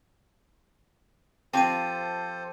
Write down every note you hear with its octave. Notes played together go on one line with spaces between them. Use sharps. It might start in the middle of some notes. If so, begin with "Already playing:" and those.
F3 C4 F4 G4 A4 C5 A5 D#7